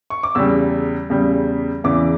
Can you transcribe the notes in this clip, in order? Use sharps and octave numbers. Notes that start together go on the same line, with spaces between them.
C#6
D6
E2 C#3 G3 E6
E2 C#3 G3
E2 C#3 E3 D6